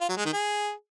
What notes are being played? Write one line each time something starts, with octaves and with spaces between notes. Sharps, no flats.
F4
F#3
G#3
D#3
G#4